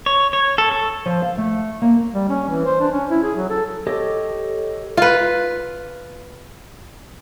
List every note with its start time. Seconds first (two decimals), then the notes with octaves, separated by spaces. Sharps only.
0.06 C#5
0.33 C#5
0.58 A4
0.72 A4
1.06 F3
1.22 F5
1.38 A3
1.82 A#3
2.13 G3
2.29 C#4
2.49 E3
2.65 C5
2.80 D4
2.92 C#4
3.10 E4
3.23 G#4
3.36 F#3
3.49 A4
3.87 G4 A4 C#5 D#5 D6
4.97 F4 B4